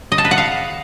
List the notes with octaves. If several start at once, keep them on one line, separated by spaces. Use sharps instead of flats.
D#5
A5
B4
F#5
F5